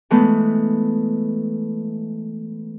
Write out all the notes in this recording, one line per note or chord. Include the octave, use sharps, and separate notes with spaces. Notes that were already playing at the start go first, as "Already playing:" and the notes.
E3 G#3 A3 B3